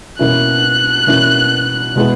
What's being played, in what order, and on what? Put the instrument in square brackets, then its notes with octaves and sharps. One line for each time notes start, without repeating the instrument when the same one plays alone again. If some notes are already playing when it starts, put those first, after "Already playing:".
[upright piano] B2 A#3 C#4 E4 [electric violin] F#6
[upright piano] B2 A#3 C#4 E4
B2 G#3 B3 E4